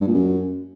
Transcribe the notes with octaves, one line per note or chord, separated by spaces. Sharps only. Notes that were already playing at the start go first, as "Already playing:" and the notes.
G2
A#2
F#2